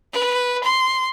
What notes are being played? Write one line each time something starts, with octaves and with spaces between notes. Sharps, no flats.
B4
C6